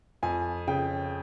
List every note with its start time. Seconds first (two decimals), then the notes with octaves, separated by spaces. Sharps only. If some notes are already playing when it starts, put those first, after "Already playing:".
0.23 F2 G#5
0.67 C#3 G5